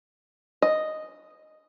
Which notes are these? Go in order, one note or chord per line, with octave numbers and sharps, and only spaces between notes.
D#5